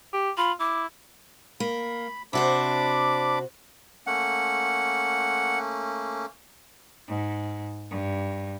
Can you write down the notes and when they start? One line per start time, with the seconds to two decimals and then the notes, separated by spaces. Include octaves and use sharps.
0.13 G4
0.37 F4 B5
0.60 E4 D6
1.60 A#3 B5
2.33 C3 D4 F#4 C5 B5 D6
4.07 A3 A#3 C#4 F#5
7.08 G#2
7.91 G2